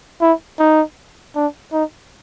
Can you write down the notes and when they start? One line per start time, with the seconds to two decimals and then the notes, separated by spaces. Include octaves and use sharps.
0.21 E4
0.59 D#4
1.35 D4
1.72 D#4